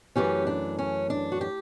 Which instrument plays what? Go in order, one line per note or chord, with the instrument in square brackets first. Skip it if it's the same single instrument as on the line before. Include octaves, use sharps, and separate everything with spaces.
[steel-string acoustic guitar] F#2 E3 A3 C#4 G4
D4
C#4
D4
F#4
G4